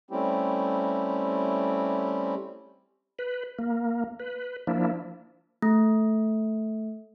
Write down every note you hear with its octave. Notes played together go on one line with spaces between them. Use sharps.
G3 A3 C4 C#4 E4 G4
B4
A#3
B4
F3 A#3 D4 E4
A3